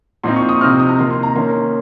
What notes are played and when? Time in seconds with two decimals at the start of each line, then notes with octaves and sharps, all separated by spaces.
0.23 A#2 F3 C4 D#4 C6
0.36 C#6
0.49 D#6
0.61 C3 F3 C4 D#4 F6
0.79 D#6
0.89 A#5
0.98 D#3 A#3 D#4 C6
1.11 C6
1.23 A#5
1.35 D#3 A#3 C#4 C6